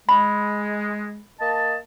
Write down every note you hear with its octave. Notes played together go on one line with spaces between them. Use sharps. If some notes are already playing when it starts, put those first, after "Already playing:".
G#3 B5
A#3 D#5 A5